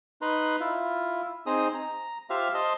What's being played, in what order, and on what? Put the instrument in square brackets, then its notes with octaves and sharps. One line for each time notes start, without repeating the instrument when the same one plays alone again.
[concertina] D#4 B4 A#5 C6
E4 F4
C4 D#4 G#4 C5 A#5 D#6
A#5
F4 G4 C5 E5 F5
C5 D#5 A5 C6